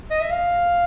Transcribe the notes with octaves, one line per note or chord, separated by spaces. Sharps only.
D#5
E5
F5